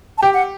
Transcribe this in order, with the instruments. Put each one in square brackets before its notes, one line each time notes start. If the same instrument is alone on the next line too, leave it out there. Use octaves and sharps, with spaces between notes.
[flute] A5
[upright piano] G4 [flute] G5
[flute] F#5